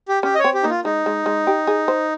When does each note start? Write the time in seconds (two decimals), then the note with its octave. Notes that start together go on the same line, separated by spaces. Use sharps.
0.08 G4
0.23 C#4 G4
0.35 D#5
0.39 C#5
0.44 C4
0.54 G4
0.63 A#3 D#4
0.69 F4
0.85 G#3 D#4
1.06 G#3
1.26 G#3
1.47 G4
1.67 G#4
1.88 C5